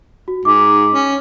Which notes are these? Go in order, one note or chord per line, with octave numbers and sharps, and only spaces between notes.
F#4
G#2 D6
C#4